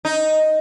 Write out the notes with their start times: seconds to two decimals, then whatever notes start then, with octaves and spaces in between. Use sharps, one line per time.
0.05 D#4